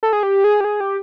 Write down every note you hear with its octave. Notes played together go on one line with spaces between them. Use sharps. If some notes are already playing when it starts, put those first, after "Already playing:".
A4
G#4
G4
G#4
G4
G#4
G4